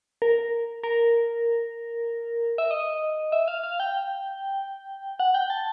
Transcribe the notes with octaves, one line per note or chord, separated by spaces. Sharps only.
A#4
A#4
E5
D#5
E5
F5
F5
G5
F#5
G5
A5